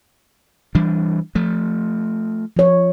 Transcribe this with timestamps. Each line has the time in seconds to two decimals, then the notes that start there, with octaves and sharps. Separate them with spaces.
0.75 E3 G3 D4
1.35 F3 A3
2.57 F3 C#5